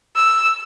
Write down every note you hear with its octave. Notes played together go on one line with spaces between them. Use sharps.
E6